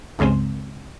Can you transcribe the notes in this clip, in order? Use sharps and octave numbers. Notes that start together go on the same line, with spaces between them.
C#2 G2 C#3 G#3 C4